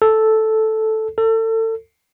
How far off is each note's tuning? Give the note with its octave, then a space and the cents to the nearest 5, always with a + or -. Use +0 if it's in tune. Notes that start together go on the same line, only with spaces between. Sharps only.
A4 -5
A4 +30